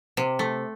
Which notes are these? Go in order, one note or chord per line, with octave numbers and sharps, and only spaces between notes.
C3
A3